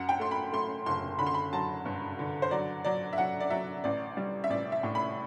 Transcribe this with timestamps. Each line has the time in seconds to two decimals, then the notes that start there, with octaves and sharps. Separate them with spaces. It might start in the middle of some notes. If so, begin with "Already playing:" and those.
Already playing: F#2 F#5
0.09 G5
0.20 A3 C6
0.31 B5
0.53 A3 C6
0.86 F#1 C6
1.19 D3 B5
1.26 C6
1.34 B5
1.53 F#3 A5
1.85 G2
2.19 D3
2.42 C5
2.51 F#3 D5
2.85 F#3 D5
3.13 E5
3.18 F#3 F#5
3.40 D5
3.50 F#3 E5
3.84 A1 D5
4.17 G3
4.44 E5
4.50 A1 D5
4.72 E5
4.83 A2
4.95 B5